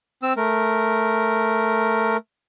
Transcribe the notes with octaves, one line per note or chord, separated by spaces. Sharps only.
C4 E6
A3 A#4